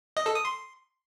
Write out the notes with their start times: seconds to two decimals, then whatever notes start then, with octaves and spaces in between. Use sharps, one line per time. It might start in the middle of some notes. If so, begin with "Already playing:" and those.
0.17 D#5
0.26 A4
0.35 D#6
0.45 C6